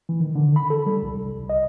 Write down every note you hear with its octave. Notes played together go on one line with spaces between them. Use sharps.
E3
D#3
D3
B5
A4
G3
C2
C2
D#5